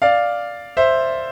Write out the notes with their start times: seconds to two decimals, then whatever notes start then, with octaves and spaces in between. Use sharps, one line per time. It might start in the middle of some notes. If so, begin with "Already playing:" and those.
0.02 D5 F5
0.77 C5 E5